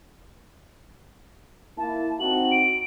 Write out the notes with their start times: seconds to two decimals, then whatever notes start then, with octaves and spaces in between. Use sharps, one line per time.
1.78 A#3 E4 A5
2.20 C4 D#4 F#4 F#7
2.51 D7